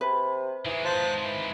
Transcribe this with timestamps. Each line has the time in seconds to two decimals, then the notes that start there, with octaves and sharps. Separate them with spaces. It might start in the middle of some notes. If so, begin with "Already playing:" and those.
0.01 C3 B4
0.65 D#3 E3 G#3
0.85 F3 C5 A5 F#6
1.23 E3 B4